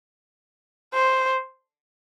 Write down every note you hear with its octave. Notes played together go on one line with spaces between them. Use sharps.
C5